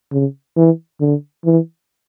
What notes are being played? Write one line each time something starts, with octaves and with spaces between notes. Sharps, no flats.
C#3
E3
D3
E3